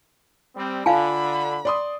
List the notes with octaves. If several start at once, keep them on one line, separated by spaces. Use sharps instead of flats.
G3 C4
D3 F4 F5 G#5 A5 B5
D5 C6 D#6